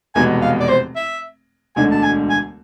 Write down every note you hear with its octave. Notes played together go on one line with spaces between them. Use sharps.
F1 E2 B2 G#3 B3 G#5
F5
D5
C5
E5
E1 D2 D3 G#3 D4 G#5
A5
G#5
G#5